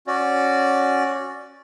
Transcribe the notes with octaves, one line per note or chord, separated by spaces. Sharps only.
C#4 F#4 D5